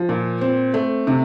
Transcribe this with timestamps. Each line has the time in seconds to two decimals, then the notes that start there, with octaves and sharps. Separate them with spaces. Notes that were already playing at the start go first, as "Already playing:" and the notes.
Already playing: F3
0.09 A#2
0.41 C4
0.74 A3
1.07 C3